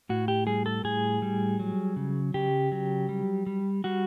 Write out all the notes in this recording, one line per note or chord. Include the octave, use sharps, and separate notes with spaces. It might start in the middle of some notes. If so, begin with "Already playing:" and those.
A2 F#4
G4
G3 G#4
A4
A2 G#4
G3
F#3
C#3
C#3 G4
F#3
G3
G3
G3 F#4